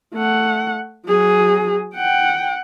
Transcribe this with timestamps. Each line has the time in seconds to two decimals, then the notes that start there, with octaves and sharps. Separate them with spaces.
0.14 A3 F#5
1.07 F#3 G#4
1.96 F#5 G5